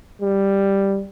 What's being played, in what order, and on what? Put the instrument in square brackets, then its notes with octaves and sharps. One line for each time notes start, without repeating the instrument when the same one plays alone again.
[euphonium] G3